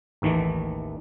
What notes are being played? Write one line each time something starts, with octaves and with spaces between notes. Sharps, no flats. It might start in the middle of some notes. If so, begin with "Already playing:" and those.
A1 D#2 D#3 E3 A3